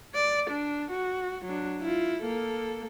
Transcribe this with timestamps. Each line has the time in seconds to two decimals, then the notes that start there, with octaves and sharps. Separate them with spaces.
0.15 D5
0.50 D4
0.91 F#4
1.45 F#3 D4
1.81 E4 F4
2.23 A#3 A4